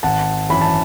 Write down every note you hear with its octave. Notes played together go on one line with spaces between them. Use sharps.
G#1 F#5 A5
F#2 E3 B5
A5